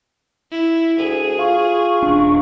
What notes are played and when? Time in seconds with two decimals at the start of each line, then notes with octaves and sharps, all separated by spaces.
0.52 E4
0.99 D2 G#4 D#7
1.39 F4 C#6
2.03 D#1 D4